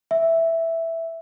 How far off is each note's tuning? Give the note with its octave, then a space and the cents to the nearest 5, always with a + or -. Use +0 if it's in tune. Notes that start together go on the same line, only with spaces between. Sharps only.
E5 +0